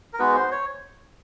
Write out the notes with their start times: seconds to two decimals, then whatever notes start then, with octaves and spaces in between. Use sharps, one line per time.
0.13 A#4
0.19 G#3 B3 D#4 F#4 B4
0.35 C5
0.51 C#5